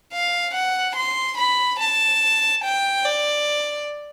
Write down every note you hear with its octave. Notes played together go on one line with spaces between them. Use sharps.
F5
F#5
C6
B5
A5
G5
D5